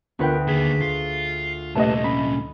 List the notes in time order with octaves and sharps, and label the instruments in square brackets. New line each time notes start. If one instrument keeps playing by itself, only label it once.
[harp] D2 B4 G5 [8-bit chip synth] B3 F4 A#4
[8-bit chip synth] D#2 D3 B6 [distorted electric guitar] D#3 A#3 [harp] G#4
[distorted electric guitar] F4 [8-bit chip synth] C7
[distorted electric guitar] C2 A#2 [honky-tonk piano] A3 D#5 [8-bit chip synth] G4 B4 A5
[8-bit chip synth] C#4 [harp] B5